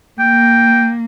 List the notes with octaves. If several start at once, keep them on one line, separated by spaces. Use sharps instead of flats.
A#3 G5